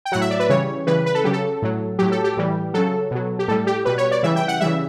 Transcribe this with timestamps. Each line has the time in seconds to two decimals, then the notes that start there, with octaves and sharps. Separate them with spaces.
0.05 G5
0.12 A2 F#3 F#5
0.21 E5
0.31 D5
0.40 B4
0.49 C#3 E3 G3 C#5
0.87 C#3 E3 G3 B4
1.06 B4
1.15 A4
1.24 C#3 F#3 G4
1.33 A4
1.62 A2 F#3
1.99 A2 F#3 G4
2.12 A4
2.24 G4
2.37 A2 E3 G3
2.74 C#3 F#3 A4
3.11 B2 F#3
3.39 G4
3.48 A2 G3 A4
3.67 G4
3.85 B2 G3 B4
3.98 C#5
4.11 D5
4.23 C#3 E3 G3 E5
4.36 G5
4.48 F#5
4.61 C#3 E3 G3 E5